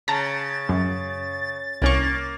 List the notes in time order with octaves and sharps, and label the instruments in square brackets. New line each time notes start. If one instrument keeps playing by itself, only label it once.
[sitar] C#3 [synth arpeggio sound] A5 A#5 [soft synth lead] A6
[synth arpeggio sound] F#2
[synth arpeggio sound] C2 C#4 C#6 [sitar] A#3